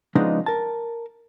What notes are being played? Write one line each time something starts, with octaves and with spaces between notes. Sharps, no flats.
C#3 F3 G#3 B3 D4 D#4
A#4 A5